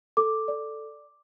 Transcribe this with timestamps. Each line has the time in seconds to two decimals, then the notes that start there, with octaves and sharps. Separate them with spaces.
0.17 A4 D6
0.48 D5